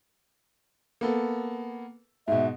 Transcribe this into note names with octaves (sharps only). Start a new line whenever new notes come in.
A#3 B3 A4
G#2 B2 E5